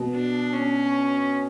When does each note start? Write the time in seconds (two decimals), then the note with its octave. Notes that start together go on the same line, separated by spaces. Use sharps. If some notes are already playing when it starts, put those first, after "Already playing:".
Already playing: B2
0.15 D4
0.53 C#4